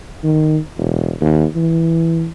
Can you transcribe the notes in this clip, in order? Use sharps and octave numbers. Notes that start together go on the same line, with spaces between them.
D#3
E1
D#2
E3